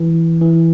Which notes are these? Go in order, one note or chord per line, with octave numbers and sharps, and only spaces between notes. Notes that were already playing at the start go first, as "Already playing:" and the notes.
Already playing: E3
E3